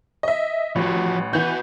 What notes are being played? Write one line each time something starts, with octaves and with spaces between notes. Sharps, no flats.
D#5 E5
A1 F3 F#4
E3 B3 F#4 G6